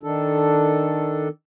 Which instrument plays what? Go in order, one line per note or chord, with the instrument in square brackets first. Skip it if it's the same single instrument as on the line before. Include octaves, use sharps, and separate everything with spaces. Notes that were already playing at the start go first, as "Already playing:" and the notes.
[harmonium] D#3 D4 A4